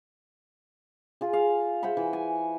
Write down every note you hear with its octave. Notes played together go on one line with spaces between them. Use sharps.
F4 G#4
F5
C5 E5 F#5 B5
E3
G#5